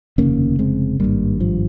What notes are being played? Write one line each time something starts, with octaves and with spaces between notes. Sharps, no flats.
F1 D#2 C#3 A#3 C#4
G#3 C4
G#1 G2 G3 A#3
F3